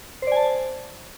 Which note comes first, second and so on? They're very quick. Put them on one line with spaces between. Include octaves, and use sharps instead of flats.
C5 D5 G#5 A5